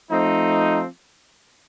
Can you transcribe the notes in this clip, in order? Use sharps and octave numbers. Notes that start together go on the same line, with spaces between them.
F3 A3 C4 D#4